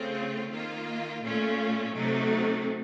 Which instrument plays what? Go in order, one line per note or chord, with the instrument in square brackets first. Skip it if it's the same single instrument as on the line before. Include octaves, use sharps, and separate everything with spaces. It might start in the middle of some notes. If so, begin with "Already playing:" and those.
Already playing: [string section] C#3 A3 C4 F4
D#3 A#3 F4
A#2 A3 C#4 F4
C3 F#3 A3 D#4